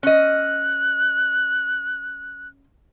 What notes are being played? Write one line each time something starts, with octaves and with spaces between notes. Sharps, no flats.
C#4 D#5 F#6